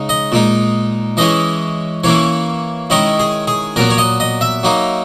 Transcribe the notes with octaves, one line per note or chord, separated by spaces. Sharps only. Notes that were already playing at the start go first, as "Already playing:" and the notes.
Already playing: C#3 G#3 D#4
D#5
A#2 G#3 D#4
E3 G#3 C#4 E4 D#5
E3 A#3 C#4 E4 C#5
D#3 G#3 C#4 E4 D#5
G#4
G#4
A#2 F#3 B3 A#4
C#5
D#5
D#5
E5
F#3 A#3 D#4